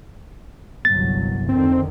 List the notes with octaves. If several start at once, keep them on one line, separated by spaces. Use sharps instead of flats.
G1 C2 F#3 A6
F2 D3 D#3 C4